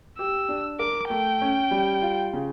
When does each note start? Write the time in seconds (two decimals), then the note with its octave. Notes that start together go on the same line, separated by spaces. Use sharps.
0.18 G4 E6
0.49 D4
0.79 A#4 D6
1.10 A3 G5
1.41 C#4
1.71 G3
2.02 F4
2.33 C#3